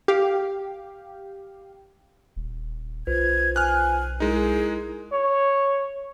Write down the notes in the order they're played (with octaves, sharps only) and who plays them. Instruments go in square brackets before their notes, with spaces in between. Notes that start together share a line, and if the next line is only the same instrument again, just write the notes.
[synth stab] G4 F5
[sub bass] D#1
[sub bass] B1 [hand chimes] F4 B4 C5 [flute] G#6
[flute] G#5 [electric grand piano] F6 F#6
[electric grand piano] G#3 D#4 [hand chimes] E4 A#4 [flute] G#4
[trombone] C#5